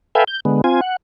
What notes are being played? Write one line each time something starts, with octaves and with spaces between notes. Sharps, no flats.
A4 B4 E5 F5 G5 G#5
G6
D3 G#3 B3
C4 F4 G#5
F#5